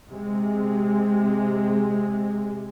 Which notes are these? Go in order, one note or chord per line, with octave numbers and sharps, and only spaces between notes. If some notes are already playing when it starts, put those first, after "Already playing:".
C3 G#3